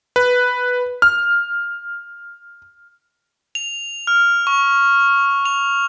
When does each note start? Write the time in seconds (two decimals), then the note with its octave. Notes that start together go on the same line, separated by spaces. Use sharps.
0.16 B4
1.02 F6
3.55 F7
4.07 F6
4.47 C#6
5.45 F7